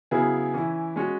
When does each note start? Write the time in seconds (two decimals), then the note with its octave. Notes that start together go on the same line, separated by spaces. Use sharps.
0.11 C#3 F#3 B3 E4 G#4
0.54 E3 C#4 E4
0.96 G#3 C#4 F#4